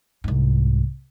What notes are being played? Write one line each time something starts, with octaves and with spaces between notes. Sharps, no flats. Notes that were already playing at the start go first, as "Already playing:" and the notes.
C2 G#2